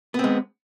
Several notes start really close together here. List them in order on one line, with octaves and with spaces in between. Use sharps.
B3 C4 G#3